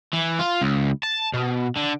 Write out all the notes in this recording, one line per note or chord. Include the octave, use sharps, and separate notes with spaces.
E3
F4
C#2
A5
B2
D3